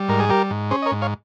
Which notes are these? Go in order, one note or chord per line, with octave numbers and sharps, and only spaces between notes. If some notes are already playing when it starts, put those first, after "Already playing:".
Already playing: G3
G#2 A#4
G#4
G3 G4 A#4
G#2
C#4 G#4 C5
D#5
A#4 C#5
G#2
C#5 F5